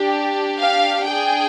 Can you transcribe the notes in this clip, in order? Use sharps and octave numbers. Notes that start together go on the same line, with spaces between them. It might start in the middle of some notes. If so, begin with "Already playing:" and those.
Already playing: D4 G4
F5
D4 G#4 G5